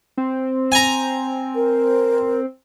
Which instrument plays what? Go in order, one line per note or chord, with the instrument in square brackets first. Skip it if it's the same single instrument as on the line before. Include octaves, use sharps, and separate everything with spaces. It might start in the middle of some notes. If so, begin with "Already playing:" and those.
[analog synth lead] C4
[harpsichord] G#5 A#5
[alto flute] A#4